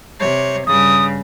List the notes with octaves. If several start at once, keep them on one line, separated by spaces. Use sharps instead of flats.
C3 C#5
G2 C#3 D#6